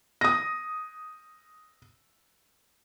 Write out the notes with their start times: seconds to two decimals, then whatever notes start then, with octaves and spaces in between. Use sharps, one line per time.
0.21 D#6 A#6